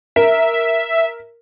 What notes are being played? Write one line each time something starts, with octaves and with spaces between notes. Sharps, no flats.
A#4 E5